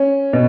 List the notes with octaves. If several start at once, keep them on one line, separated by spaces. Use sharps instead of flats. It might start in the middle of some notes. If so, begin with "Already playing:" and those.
Already playing: C#4
B2